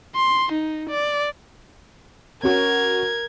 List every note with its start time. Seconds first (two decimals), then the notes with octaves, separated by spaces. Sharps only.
0.15 C6
0.52 D#4
0.90 D5
2.43 C#4 F#4 A#4 G#6